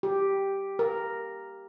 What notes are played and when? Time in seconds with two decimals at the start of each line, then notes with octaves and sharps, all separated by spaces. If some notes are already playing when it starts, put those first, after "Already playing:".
0.03 G4
0.79 A#4